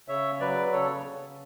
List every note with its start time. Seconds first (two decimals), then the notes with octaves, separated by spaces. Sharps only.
0.08 C#3 C#5 E5
0.40 F#3 B4 D5
0.72 C#3 A4 C#5
1.06 C#3